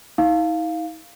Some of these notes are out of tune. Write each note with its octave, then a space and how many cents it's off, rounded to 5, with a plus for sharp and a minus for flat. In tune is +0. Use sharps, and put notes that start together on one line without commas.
D#4 +45 F5 +0